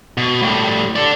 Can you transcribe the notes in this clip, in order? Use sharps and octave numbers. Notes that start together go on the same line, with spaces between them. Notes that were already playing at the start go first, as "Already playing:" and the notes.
B2
A2 G3
A4 D5